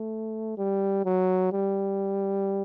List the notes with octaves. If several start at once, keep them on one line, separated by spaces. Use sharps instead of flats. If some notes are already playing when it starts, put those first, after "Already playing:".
Already playing: A3
G3
F#3
G3